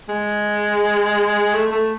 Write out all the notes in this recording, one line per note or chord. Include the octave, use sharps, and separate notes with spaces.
G#3
A3
A3